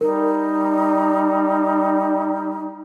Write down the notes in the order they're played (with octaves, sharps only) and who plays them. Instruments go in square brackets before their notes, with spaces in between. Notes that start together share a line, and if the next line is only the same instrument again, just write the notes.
[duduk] G3 [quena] D#4 [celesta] A#4